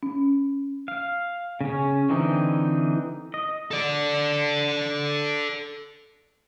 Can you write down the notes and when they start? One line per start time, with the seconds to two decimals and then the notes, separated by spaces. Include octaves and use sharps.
0.03 C#4
0.88 F5
1.61 C#3 C#4
2.09 D3 E3 C4 D#4
3.34 D#5
3.71 A4 D5